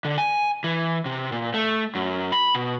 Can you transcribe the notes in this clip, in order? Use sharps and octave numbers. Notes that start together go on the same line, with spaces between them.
D3
G#5
E3
C3
A#2
A3
F#2
B5
B2